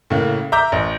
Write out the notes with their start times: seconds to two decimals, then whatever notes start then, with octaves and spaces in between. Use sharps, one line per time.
0.10 A2 C#3 A#3
0.52 E5 A#5 D6 G6
0.72 A1